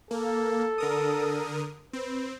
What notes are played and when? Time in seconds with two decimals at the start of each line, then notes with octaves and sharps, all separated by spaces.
0.11 A#3 A4
0.78 D3 A#4 D#6
1.93 C4 B4